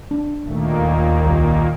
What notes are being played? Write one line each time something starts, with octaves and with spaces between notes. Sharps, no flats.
D4
D2 A#2 D#3 A3 A#3
D#2
C2